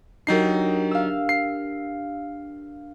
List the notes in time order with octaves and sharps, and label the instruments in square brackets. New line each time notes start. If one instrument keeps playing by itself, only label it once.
[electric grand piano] F#3 D#4 C7 [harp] D4 G4 A#4
[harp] F5 E6
[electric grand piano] C7